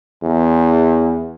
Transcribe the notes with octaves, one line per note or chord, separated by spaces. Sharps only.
E2